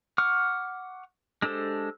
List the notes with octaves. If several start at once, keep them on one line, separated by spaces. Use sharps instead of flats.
F#5 C#6 D6 F6
G#3 D4 G4 A4 C5